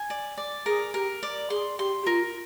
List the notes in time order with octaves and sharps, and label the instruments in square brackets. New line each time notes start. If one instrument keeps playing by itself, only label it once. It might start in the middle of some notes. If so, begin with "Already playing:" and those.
Already playing: [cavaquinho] G#5
D5
D5
[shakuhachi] G#4 [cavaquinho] A#4
[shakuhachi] G4 [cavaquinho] A#4
[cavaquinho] D5
[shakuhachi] G#4 [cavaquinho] C6
[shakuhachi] G4 [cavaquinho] C6
[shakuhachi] G4
[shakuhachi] F4 [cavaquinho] A#4